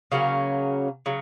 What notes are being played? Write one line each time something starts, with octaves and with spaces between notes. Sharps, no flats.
C#3 F#3 A#3 C#4
C#3 F#3